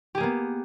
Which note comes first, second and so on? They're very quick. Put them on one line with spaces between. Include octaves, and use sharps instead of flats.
G4 G#4 A#3 B3